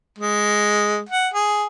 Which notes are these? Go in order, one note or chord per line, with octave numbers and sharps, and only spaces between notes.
G#3
F#5
G#4